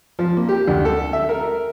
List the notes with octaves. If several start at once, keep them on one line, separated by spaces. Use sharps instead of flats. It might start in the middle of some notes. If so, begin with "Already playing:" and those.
F3
A#3
G4
D2
A4
E5
A#4